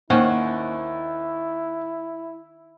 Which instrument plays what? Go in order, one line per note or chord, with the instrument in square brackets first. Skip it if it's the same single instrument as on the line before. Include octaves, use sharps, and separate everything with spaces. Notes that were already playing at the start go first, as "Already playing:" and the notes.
[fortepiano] D#2 [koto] D#3 C#4 [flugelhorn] E4 [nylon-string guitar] C5 D#5 F#5